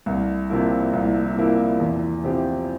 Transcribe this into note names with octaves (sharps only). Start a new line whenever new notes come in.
C2
C3 F3 A#3 E4
C2
C3 F3 A#3 E4
E2
C3 F3 C4 G4